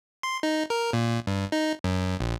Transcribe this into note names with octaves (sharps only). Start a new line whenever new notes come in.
C6
D#4
A#4
A#2
G2
D#4
F#2
A#1